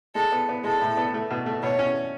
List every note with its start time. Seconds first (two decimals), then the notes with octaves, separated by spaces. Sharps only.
0.15 G#3 A4
0.32 B3
0.49 B3
0.64 G#3 A4
0.81 A2
0.97 B3
1.14 A3
1.30 B2
1.46 A3
1.63 B2 C#5
1.79 C#4